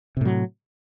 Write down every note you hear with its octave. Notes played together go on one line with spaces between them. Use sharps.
A2 C3 F#3